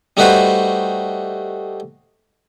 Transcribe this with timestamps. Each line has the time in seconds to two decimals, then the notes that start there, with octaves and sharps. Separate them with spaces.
0.17 G3 A3 D#4 F#4 B4 C5